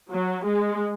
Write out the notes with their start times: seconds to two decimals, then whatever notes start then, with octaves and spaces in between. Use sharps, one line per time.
0.11 F#3
0.44 G#3